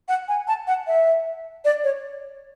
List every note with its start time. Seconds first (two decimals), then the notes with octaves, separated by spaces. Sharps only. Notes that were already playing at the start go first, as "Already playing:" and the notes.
0.08 F#5
0.28 G#5
0.48 A5
0.67 F#5
0.87 E5
1.65 D5
1.84 C#5